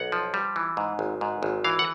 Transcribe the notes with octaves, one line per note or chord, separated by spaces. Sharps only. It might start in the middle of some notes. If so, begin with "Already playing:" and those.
Already playing: B1 F#5
F3
G3
E3
G#2
G#1
G#2
G#1
E3 F5
F#5